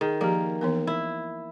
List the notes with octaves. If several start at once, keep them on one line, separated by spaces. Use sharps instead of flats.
D#3 G#4
F3 A#3 G4
E3 B3 A#4
E4